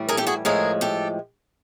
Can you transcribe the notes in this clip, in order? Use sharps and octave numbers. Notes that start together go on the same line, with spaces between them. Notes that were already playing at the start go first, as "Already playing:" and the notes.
Already playing: A2 E3 G3
G#4 A#4
G4 A4
F#4 G#4
A2 F3 G#3 G#4 A#4
G4 A4